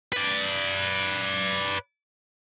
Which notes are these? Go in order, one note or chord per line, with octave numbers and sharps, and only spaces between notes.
B4 D5